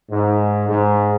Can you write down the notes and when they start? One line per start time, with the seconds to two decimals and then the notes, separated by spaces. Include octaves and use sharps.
0.11 G#2
0.68 G#2